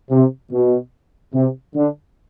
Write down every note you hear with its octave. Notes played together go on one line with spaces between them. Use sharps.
C3
B2
C3
D3